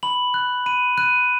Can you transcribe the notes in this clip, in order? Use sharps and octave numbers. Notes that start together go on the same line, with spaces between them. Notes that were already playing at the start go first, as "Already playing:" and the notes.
B5 F#7
F#6
B5 D#7
F#6 D#7